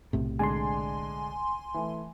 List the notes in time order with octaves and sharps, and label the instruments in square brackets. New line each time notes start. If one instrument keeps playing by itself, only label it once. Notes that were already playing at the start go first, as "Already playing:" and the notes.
[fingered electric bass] B1 A2 C3
[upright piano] D3 G#3 D5 [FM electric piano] G#5 C6
[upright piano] E3 A3